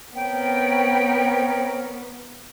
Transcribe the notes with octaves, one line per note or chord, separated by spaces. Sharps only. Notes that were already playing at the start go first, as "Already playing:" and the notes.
B3 C4 A#4 C#5 G5